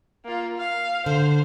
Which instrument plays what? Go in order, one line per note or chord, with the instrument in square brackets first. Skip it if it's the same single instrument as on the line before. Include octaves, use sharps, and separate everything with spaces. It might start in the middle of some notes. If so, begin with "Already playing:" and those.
[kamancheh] A#3 F4
F5
[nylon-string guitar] D3 [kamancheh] C5